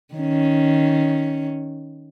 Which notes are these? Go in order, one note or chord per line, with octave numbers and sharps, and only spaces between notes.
D#3 C#4